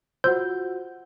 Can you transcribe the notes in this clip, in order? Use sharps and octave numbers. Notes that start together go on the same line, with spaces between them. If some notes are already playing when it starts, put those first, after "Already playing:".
F4 F#4 C5 F#5 E6 G6